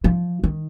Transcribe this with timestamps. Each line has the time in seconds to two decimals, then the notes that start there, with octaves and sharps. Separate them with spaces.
0.04 F3
0.44 D#3